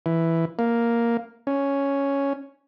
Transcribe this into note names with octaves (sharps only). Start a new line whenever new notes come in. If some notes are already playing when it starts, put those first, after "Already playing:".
E3
A#3
C#4